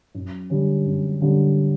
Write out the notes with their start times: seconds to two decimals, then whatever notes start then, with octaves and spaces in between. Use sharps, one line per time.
0.15 F#2
0.50 D3 G3 C#4
0.85 F#2
1.21 D3 G3 C#4